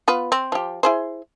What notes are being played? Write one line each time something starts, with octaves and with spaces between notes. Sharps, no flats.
B3 F4 B4
C4
F3 G4
E4 G#4 C5